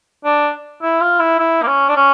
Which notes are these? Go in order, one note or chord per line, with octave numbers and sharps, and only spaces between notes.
D4
E4
F4
E4
E4
A#3
C#4
D4
C#4